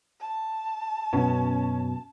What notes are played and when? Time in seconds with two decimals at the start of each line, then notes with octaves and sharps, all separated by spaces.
0.21 A5
1.13 F#2 B2 B3 C#4